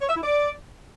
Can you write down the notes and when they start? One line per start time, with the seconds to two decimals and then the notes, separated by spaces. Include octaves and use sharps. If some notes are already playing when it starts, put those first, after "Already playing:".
0.01 C#5
0.08 E5
0.16 E4
0.23 D5